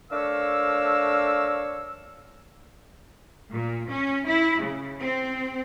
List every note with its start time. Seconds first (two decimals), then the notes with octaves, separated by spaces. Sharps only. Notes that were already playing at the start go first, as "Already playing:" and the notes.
0.12 A3 D4 A#4 C#5 F5 E6
3.53 A#2
3.90 C#4
4.28 E4
4.62 C#3
5.00 C4